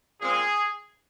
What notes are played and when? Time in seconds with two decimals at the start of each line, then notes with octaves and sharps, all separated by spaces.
0.20 A#2 G#3 C4 G#4